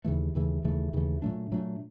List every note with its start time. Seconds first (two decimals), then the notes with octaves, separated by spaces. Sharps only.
0.04 D#2 C#3 E3 A3
0.35 D#2 C#3 E3 A3
0.64 D#2 C#3 E3 A3
0.93 D#2 C#3 E3 A3
1.22 A#2 F#3 A3 D4
1.51 A#2 F#3 A3 D4